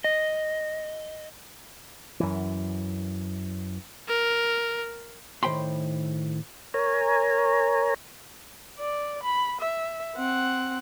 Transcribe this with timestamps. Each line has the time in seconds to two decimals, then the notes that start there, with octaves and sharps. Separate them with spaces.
0.04 D#5
2.20 F#2 E3
4.08 A#4
5.43 A2 D#3 C5 G5 B5 C6
6.74 A#4 C#5 G#5 A#5
8.79 D5
9.24 B5
9.61 E5
10.16 C4 F#5